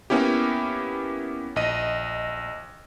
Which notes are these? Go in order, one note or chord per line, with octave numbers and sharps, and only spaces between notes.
A#3 B3 C#4 E4 G4
A#1 D#5 D#7